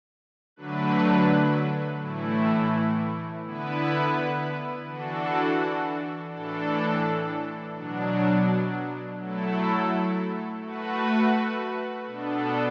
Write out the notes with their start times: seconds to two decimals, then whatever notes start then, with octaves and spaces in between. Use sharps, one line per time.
0.56 D3 F#3 A3 D4 B4
2.00 A2 E3 A3 E4
3.45 D3 B3 E4 B4
4.87 E3 D4 F#4 A4
6.31 A2 E3 D4 A4
7.75 B2 F#3 D4
9.19 F#3 A3 E4 A4
10.63 A3 F#4 B4
12.06 B2 B3 D4 A4